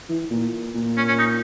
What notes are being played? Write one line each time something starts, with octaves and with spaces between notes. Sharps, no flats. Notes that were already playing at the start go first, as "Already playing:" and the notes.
E3
A#2
A#2
C#4
C#4
D#4